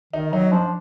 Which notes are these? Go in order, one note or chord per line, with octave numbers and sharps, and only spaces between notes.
D#3 D#4
F#3 D#4
F3 D4